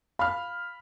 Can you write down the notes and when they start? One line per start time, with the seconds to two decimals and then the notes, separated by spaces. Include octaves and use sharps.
0.19 F5 B5 F6